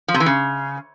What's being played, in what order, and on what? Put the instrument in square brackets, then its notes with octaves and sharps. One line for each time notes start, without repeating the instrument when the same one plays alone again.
[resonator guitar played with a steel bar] F3
C3
E3
C#3